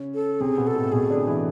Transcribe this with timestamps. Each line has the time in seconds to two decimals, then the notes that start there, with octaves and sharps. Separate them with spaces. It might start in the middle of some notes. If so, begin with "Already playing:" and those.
Already playing: C#3 C#4
0.15 A4
0.40 C3 C4 G#4
0.58 B2 B3
0.67 A4
0.75 A2 A3
0.92 B2 B3 G#4
1.10 D3 D4
1.27 E3 E4